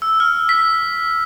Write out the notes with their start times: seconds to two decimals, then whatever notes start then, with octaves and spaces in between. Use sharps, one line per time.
0.02 E6
0.20 F6
0.49 B6